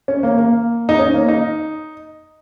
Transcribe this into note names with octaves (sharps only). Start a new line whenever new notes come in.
C#4
A#3
A#3
D#4
C#4
A#3
D#4